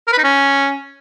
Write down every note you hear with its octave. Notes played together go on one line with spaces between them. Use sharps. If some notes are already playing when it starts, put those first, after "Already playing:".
A#4
B4
D#4
C#4